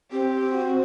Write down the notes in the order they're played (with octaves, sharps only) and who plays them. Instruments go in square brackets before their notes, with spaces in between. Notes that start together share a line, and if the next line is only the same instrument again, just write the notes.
[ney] C4 [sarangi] G4
[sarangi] F#4